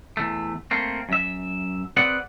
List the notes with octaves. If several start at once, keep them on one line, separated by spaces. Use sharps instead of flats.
E2 A3
A3 A#3 C4
F#2 E5
C4 G#4 B4 D5 F#5